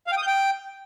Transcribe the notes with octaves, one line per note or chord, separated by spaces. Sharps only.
F5
G5
D#6
G6
G5